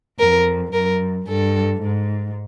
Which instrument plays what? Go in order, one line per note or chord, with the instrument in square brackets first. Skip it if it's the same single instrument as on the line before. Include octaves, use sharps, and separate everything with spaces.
[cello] F2 [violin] A#4
[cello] F#2 [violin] A#4
[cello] G2 [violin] A4
[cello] G#2